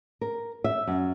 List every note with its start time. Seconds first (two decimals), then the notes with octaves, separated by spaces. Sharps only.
0.21 A#4
0.64 E5
0.87 F#2